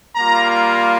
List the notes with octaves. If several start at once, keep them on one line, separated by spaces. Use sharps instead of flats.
G3 A#3 F4 A#5
A#5